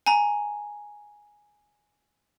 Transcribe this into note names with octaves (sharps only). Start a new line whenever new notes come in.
G#5 A#5